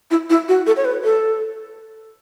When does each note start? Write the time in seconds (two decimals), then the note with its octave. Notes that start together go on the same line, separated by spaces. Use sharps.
0.11 E4
0.30 E4
0.48 F#4
0.67 A4
0.76 C#5
0.85 B4
1.04 A4